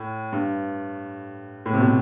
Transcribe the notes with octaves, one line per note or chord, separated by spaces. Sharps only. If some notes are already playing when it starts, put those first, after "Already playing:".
Already playing: A2
G2
A2
C3
B2